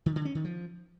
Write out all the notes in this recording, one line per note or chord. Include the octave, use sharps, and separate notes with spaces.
D#3
D3
C#4
D#3
F3